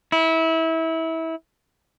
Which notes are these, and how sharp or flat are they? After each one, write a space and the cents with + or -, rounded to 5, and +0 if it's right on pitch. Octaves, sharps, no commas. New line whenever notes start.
E4 -25